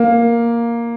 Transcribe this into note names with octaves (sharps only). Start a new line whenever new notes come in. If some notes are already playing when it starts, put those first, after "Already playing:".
Already playing: A#3